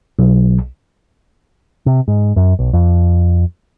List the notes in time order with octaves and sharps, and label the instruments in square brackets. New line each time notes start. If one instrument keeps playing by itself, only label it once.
[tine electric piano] B1
[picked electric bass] C3
G#2
F#2
B1
F2